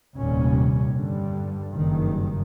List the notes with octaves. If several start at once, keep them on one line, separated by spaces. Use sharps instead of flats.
F1 D#2 A#2 G3 C#4
G2 D3 G3
F#1 G2 D#3